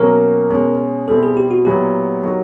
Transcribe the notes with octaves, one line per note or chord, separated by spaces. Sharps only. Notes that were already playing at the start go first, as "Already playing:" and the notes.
Already playing: B2 F#3 A#3 C#4 A#4
B2 G#3 C#4
B2 G3 C4 E4 A4
G#4
G4
F#4
A#2 F#3 B3 E4 G4
F#3 A#3 D#4 F#4